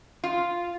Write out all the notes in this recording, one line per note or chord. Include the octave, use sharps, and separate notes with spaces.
F4